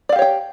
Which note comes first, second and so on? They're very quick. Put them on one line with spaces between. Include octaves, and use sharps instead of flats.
D5 F5 G4 C#5 G5